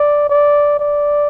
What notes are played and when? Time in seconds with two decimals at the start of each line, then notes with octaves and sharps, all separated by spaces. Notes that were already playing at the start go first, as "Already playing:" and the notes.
Already playing: D5
0.30 D5
0.80 D5